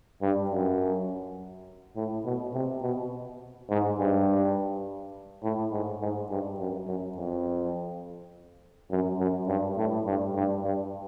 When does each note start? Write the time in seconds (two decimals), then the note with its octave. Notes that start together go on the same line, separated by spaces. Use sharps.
0.22 G2
0.51 F#2
1.96 A2
2.25 B2
2.54 C3
2.82 B2
3.70 G#2
3.99 G2
5.43 A2
5.72 G#2
6.01 G#2
6.30 G2
6.59 F#2
6.87 F#2
7.17 F2
8.91 F#2
9.19 F#2
9.47 G2
9.77 A2
10.06 G2
10.35 G2
10.64 G2